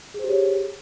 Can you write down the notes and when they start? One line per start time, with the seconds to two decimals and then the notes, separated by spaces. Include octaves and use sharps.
0.14 G#4
0.19 C5
0.24 G4
0.29 C#5